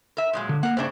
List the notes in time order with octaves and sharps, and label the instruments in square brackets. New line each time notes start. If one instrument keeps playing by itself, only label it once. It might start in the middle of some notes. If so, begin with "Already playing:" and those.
[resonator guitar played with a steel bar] A#4 E5
A#2 F#3 G#3
[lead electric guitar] D3
[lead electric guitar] A#3 [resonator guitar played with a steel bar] A#4 F#5
[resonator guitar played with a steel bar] G2 C#3 D4 [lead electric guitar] C5 E5